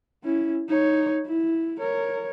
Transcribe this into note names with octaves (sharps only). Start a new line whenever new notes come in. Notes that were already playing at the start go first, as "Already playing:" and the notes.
C#4 E4
D#4 C#5
E4
A#4 C#5